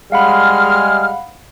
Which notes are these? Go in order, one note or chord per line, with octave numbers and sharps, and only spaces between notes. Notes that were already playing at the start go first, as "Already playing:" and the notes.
G3 G#3 F5 F#5 B5 F6